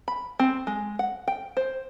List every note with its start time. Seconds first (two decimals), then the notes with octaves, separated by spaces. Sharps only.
0.08 B5
0.39 C4
0.67 G#3
0.99 F#5
1.28 G5
1.57 C5